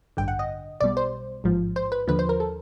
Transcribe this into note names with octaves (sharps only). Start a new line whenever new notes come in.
A1 G2 D3 G5
F#5
D#5
B1 B2 G3 D5
C5
A1 G#2 F3
C5
B4
D#2 D3 F3 B4
C5
A#4
A4